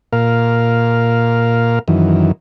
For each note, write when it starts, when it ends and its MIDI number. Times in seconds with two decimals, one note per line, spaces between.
0.13 1.79 46
0.13 1.79 70
0.13 1.79 77
1.88 2.32 42
1.88 2.32 51
1.88 2.32 52